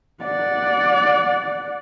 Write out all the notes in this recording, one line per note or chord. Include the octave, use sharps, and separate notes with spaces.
D5 F#5